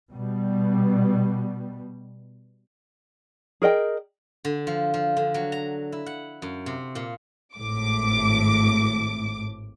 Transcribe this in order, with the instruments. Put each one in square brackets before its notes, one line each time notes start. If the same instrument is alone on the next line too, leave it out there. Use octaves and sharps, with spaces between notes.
[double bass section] B2 G3
[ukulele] G#4 A#4 D#5 G5
[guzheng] D3
F3
F3
D3
F#3
A#5
E4
F#5
F#2
C3
A#2
[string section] G#1 A2 D6